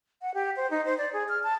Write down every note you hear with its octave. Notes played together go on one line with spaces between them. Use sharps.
F#5
G4
C5
D#4
C5
D5
G#4
F6
A5